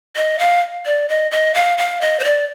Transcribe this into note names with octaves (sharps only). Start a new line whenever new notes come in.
D#5
F5
D5
D#5
D#5
F5
F5
D#5
C5
D5